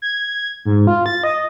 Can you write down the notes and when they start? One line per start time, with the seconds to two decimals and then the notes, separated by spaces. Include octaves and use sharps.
0.02 G#6
0.65 G#2
0.87 F4
1.06 A6
1.24 D#5